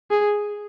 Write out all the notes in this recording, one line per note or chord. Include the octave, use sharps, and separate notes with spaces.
G#4